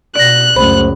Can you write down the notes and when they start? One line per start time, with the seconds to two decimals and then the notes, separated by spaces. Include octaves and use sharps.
0.16 B2 D5 F#6 A#6
0.56 C#2 F#2 A3 C5 B5